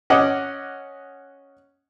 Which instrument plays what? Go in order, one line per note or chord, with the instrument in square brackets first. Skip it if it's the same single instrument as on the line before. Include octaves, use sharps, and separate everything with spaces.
[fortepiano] C#4 D#5 F#5 D6